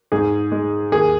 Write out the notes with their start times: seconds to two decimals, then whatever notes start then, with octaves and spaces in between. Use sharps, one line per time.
0.12 G#2 G#4
0.52 G#3
0.92 D#2 G#4